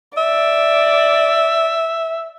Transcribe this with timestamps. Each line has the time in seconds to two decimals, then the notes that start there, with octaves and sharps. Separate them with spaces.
0.17 D5 E5